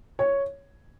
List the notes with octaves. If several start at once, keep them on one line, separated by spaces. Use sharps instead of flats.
C#5